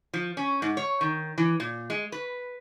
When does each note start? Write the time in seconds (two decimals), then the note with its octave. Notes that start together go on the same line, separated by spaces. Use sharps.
0.14 F3
0.37 C#4
0.62 G#2
0.77 C#5
1.01 D#3
1.38 E3
1.60 A#2
1.90 G#3
2.12 B4